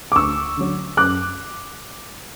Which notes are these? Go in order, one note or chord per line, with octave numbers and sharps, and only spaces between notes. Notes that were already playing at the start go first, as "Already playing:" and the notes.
D6
D2 C#6 E6
D3 F#3
F#2 D6 F#6